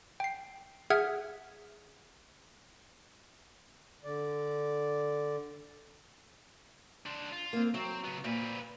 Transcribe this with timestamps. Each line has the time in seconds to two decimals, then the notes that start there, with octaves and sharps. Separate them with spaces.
0.20 G5 C7
0.90 G#4 E5 F#5 D#6 F6 G#6
4.04 D3 D5
7.06 D4 C5
7.32 F4
7.53 A#3 C4
7.74 F#3 C4
8.04 C#3 B3
8.24 A#2 C4 B4